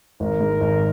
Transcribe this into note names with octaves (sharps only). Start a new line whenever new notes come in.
G#1 A#4
G#2
G#1